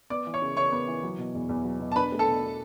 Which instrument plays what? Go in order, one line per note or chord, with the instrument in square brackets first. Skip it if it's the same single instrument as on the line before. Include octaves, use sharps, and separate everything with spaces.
[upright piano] B3 [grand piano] D5 D6
[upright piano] E3
[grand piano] C#5 C#6
[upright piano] C#3
[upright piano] C#3 [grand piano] C#5 C#6
[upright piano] B3
E3
F#3
B2
E2
E2
F#3
B2
[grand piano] A5
[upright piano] D4 [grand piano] B4 B5
[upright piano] A3
[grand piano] A4 A5
[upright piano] B2
B2